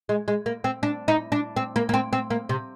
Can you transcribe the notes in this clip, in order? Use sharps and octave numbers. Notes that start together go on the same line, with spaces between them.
G#3
G#3
A#3
C4
D4
D#4
D4
C4
A#3
A#3
C4
C4
A#3
C3